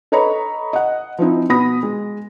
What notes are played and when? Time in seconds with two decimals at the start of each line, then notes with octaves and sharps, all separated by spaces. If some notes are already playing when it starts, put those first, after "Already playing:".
0.12 A4 B4 C#5 D#5 A#5 B5
0.73 D#5 F#5
1.19 F3 C4 D#4 E4
1.49 B2 B3 B5 D#6 A#6
1.83 G#3